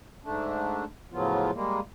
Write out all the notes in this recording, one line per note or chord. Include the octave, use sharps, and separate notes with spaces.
G#2 A3 D4
A2 C#3 F3 F#3 B3 F4
G3 G#3 A#3